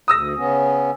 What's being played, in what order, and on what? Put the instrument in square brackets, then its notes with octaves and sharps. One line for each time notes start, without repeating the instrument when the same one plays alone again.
[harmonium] D2 [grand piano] D#6 E6 A#6
[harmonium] C#3 B3 C#4